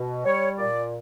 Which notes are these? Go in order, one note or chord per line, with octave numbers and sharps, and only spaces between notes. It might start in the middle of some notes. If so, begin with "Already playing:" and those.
Already playing: B2
G3 C#5
A#2 D5